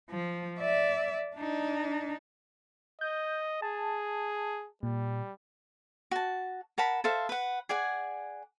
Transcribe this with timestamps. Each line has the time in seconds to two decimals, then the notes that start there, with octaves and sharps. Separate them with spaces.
0.10 F3
0.60 D5 E5
1.36 D4 D#4
3.01 D#5 G6
3.62 G#4 A5
4.83 A#2 G3
6.11 F#4 A5
6.78 A#4 F#5 A5 B5
7.04 A4 C5 E5 F5
7.29 B4 F#5
7.69 G#4 D5 F#5 G#5